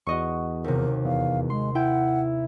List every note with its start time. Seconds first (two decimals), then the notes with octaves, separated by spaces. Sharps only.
0.07 E2 F#4 D#5 C#6
0.64 D#2 C3 A#4
1.05 E2 F5
1.50 G#3 C6
1.75 E4 F#5 G5